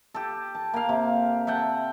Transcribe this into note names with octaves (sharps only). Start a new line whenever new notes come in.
G4 A4
A5
A#3 F5
C3
E5 F#5 G5 A5